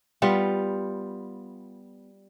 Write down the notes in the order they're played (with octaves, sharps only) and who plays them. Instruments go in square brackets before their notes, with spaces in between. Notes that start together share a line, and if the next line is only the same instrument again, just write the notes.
[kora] G3 B3 F4